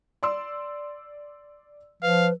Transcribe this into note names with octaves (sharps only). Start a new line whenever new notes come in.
D5 C6 E6
F3 B4 F5